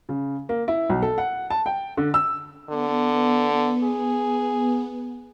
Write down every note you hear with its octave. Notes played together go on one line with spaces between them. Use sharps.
C#3
A#3
E4
B1
A4
F#5
A5
G5
D3
E6
D3 B3
G#4